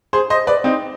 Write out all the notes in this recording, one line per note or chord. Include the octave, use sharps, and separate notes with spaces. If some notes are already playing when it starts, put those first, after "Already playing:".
G#4 C5
C5 D#5
B4 D5
C4 D#4